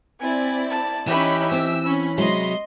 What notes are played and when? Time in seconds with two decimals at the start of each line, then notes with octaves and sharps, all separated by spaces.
0.20 C4 E4 D5 G#5
0.71 A5
1.07 E3 C#4 D#4 G4 E5 B5
1.52 C4 E6
1.86 C#4 B5
2.18 C3 F#3 G#3 D#5 C6